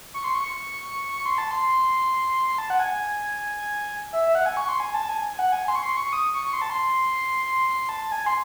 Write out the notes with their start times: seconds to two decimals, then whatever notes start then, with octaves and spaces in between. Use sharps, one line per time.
0.14 C#6
0.24 C6
0.34 C#6
1.26 C6
1.38 A5
1.51 C6
2.47 C6
2.58 A5
2.70 F#5
2.80 G#5
4.13 E5
4.26 E5
4.35 F#5
4.46 G#5
4.57 C#6
4.69 C6
4.80 G#5
4.94 A5
5.09 G#5
5.33 G#5
5.39 F#5
5.52 G#5
5.68 C6
5.75 C#6
5.83 C6
5.97 C#6
6.13 D#6
6.34 C#6
6.46 C#6
6.53 C6
6.62 A5
6.70 C6
7.45 C6
7.67 C6
7.89 A5
8.12 G#5
8.26 C6